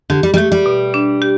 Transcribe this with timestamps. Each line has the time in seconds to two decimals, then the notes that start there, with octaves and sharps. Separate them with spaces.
0.10 D3 G4
0.23 G3
0.34 G3
0.37 A3 G4
0.52 G3
0.66 B2
0.94 D4
1.22 G4